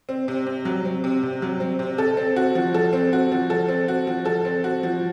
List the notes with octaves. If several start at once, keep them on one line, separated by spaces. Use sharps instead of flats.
C4
C3
C3
F#3
C4
C3
C3
F#3
C4
C3
A4
C4
F#4
F3
A4
C4
F#4
F3
A4
C4
F#4
F3
A4
C4
F#4
F3